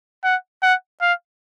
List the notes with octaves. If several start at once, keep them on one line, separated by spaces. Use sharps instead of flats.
F#5
F#5
F5